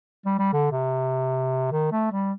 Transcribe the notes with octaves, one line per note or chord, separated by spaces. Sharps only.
G3
G3
D3
C3
D#3
A3
G3